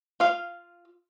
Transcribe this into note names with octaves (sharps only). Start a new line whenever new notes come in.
F4 F5